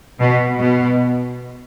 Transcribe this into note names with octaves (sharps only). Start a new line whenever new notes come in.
B2
B2